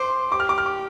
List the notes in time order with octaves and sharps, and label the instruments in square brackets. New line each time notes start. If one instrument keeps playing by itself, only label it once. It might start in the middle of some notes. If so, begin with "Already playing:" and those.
Already playing: [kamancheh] C5 [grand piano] C6 D6
[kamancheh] G4 [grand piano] D6
[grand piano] F6
D6
F6
D6